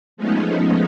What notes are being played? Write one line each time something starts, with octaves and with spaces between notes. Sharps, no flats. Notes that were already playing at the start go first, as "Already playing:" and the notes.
F3 G#3 A3 B3 C#4 D#4